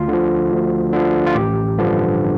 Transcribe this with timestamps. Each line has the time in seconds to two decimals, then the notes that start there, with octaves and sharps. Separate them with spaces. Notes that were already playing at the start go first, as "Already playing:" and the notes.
Already playing: D2 F4
0.08 D3 F3
0.51 D2
0.93 D3 F3
1.26 F4
1.35 A1 G4
1.78 G2 D3 F3